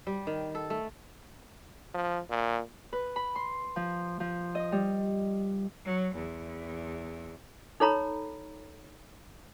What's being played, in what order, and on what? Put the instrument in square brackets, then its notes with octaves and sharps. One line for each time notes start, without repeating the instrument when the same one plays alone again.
[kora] G3
D#3
A4
A3
[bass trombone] F3
A#2
[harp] B4
B5
C6
F3
F3
D#5
G3
[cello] F#3
E2
[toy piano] D#4 A4 C#5 A#5 B5